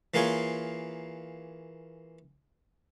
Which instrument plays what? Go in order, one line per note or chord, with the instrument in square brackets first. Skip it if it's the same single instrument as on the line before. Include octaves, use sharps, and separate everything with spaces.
[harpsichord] E3 A#3 F4 G#4 C#5